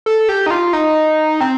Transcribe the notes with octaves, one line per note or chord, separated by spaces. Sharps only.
A4
G4
D#4
F4
D#4
C4